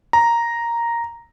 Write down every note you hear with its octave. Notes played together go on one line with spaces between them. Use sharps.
A#5